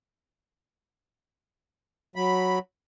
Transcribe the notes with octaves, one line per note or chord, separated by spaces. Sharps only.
F#3 B5